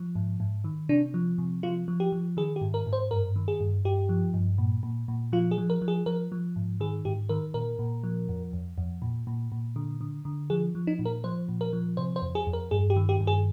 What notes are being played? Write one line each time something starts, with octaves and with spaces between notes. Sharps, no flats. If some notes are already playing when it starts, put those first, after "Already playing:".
Already playing: F3
G#2
G#2
D#3
C3 D4
F3
C3
F3 F4
F3
G4
F3
D#3 G#4
G4
G#2
A#4
G#2
C5
G2 A#4
D#3
G#4
G2
G2 G4
F3
G2
A#2
A#2
A#2
F3 F4
G#4
F3
A#4
F3
G#4
F3 A#4
F3
G#2
D#3 G#4
G#2 G4
D#3 A#4
A#2 A#4
A#2
F3
F2
F2
F2
A#2
A#2
A#2
D3
D3
D3
F3 G#4
F3
D#4
A#2
A#4
F3 C5
A#2
A#4
F3
C3 C5
C5
F2
G#4
F2
A#4
G2 G#4
G4
D#3
G4
G2
G#4